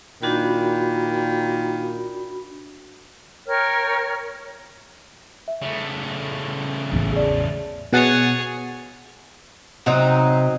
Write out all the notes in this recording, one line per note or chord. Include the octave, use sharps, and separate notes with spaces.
A#2 D#3 D4 F#4 B5
A#4 C#5 G5 F6
E5
C#3 A3
A1 E2
G#4 D5
B2 G#4 C#5 F#5 A6
C3 F#3 C4 D#4